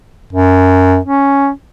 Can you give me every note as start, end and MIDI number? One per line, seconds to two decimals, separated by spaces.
0.33 0.98 42
1.05 1.49 61